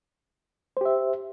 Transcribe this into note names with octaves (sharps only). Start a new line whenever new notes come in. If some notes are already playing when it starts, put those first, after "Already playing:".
G4 C5 E5